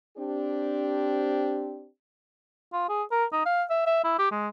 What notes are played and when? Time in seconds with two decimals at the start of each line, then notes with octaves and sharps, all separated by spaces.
0.17 C4 D4 G4
2.73 F4
2.89 G#4
3.12 A#4
3.33 D#4
3.46 F5
3.70 E5
3.87 E5
4.04 E4
4.19 G4
4.31 G#3